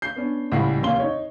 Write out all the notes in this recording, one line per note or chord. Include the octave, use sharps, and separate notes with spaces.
G6 C7
B3 C#4 D4
C#2 A2 G3 E4 F#5 C7
F1 D#2 C#4 F5 C6 G7
D#4 C#5